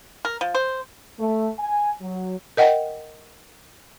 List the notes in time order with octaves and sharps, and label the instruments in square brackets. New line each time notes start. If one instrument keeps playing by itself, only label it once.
[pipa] A#4
F3
C5
[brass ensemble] A3
G#5
F#3
[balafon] A#4 D#5 F#5 G5